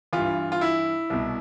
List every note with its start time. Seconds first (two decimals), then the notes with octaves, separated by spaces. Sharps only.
0.13 G2 E3 F4
0.52 F4
0.61 E4
1.10 C2 B2